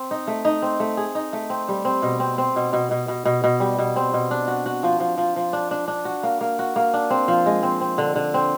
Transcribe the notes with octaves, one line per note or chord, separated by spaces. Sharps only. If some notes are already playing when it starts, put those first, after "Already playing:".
Already playing: C4
D#4
A3
D#4
C4
A3
G#4
D#4
A3
C4
G3
C4
B2
C4
C4
B2
B2
B2
B2
B2
B2
G3
B2
C4
B2
D4
F#4
F#4
F3
F3
F3
F3
D4
D4
D4
F#4
A#3
A#3
F#4
A#3
D4
C4
F3
G#3
C4
C4
D3
D3
C4